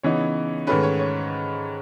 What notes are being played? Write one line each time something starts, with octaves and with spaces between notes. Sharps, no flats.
C#3 E3 B3 D#4 C#5
G#2 D#3 A3 C#4 B4
C#5
C#5